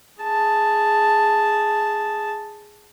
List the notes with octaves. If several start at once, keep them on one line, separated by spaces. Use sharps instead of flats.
G#4 A5